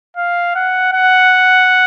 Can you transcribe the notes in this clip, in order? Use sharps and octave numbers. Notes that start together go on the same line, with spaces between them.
F5
F#5
F#5